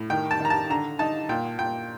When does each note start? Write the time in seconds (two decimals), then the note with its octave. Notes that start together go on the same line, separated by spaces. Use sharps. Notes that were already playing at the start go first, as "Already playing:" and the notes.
Already playing: A2
0.10 D#3 G5
0.31 A5
0.40 D#3 A#5
0.50 A5
0.70 D3 A#5
0.99 D#4 A5
1.29 A#2 G5
1.59 A#2 G5